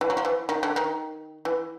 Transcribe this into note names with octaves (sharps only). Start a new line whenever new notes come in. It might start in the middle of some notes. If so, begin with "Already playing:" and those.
E3
F#3
F3
E3
D#3
D3
D#3
E3